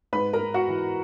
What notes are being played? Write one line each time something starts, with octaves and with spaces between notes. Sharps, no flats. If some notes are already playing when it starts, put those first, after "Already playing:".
G#2 B4 B5
A#4 A#5
G#2
F#4 F#5
E3